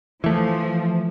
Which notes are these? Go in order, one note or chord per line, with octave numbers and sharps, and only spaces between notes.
E3 F3 A3